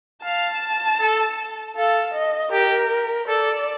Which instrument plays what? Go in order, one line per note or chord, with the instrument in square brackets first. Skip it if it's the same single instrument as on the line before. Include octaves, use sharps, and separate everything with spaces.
[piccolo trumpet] F5 [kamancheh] A5
[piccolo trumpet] A4
[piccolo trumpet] A4 [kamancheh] F5
[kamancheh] D#5
[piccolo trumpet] G4 [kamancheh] A#4
[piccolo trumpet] A4 [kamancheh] D5